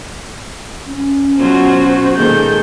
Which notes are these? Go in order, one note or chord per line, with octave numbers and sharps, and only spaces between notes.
C#4
B2 F#3 F4 F#4 C5
A#2 D#3 G#3 A#3 G#4 A4 G6